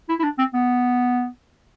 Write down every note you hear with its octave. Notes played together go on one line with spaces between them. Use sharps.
E4
E4
D4
C4
B3